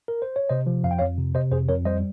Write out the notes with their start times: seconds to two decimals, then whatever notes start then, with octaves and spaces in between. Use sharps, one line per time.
0.08 A#4
0.22 C5
0.36 C#5
0.49 C3 C5 D#5
0.66 F3
0.84 F2 F5
0.91 G5
0.98 F2 C#5 F5
1.18 C3
1.35 C3 C5 D#5
1.51 F2 G#4 C5
1.68 F2 A#4 C#5
1.85 G3 C5 D#5